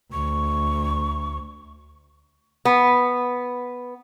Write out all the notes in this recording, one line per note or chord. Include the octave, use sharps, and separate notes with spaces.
D2 C#6
B3